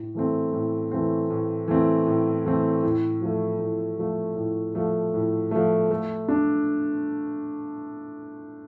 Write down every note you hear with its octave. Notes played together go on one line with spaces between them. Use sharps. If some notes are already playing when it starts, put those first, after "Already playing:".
Already playing: A2
E3 A3 C4
A2
E3 A3 C4
A2
E3 A3 C4
A2
E3 A3 C4
A2
F3 A3
A2
F3 A3
A2
F3 A3
A2
F3 A3
A3
D4